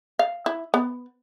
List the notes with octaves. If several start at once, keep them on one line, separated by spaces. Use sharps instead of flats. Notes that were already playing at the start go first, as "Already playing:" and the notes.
F5
E4
B3